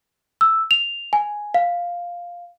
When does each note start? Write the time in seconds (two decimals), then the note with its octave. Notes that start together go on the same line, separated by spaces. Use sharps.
0.41 E6
0.71 F7
1.13 G#5
1.54 F5